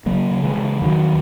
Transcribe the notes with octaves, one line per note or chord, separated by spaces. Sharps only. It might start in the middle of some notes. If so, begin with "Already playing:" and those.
C#3 F#3 A#3
C#3
E3 G#3
C#3
E2 D#3 F#3